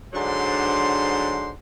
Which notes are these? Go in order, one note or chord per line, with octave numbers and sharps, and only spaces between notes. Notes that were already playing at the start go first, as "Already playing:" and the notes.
G#2 D3 F#3 D4 C5 C6